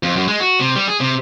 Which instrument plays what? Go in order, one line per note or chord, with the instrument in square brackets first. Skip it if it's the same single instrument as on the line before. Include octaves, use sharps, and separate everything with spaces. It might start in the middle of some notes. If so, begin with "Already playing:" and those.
[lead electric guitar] F2
F#2
G#3
F#4
C3
G3
G#4
C3